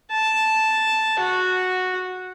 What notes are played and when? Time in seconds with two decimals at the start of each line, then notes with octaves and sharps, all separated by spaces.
0.11 A5
1.20 F#4